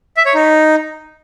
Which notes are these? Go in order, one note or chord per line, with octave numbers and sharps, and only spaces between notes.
E5
C#5
D#4